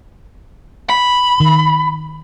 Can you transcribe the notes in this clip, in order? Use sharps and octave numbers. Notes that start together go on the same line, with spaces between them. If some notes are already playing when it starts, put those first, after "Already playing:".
B5
D#3